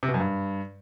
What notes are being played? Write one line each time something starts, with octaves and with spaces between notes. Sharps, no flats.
C3
B2
F#2
G2